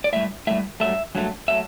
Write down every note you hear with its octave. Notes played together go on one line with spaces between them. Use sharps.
D5
A2 G3 E5
A2 G3 E5
G2 F#3 A3 E5
G2 F#3 A3
F#3 A3 E5